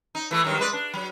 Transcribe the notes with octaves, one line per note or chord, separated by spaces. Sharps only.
D#4
E3 A3
G2 D#3 F#3
G#3 B4 D5
D4
F#3